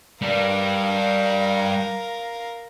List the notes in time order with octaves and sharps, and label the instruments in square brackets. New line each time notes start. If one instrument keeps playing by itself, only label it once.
[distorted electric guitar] G3 D4 [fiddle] A#4 F5